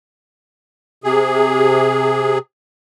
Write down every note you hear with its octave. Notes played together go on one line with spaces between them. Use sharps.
C3 G#4